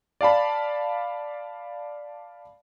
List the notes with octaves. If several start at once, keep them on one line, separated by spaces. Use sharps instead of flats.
D5 F5 A5 B5